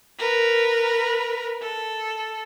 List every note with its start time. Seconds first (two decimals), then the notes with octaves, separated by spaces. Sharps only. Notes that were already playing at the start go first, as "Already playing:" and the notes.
0.18 A#4 B4
1.62 A4